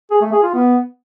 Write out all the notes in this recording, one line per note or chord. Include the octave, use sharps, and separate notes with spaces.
G#4
A3
G#4
F4
B3